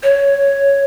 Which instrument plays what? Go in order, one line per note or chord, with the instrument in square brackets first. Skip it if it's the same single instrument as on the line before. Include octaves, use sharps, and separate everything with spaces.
[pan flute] C#5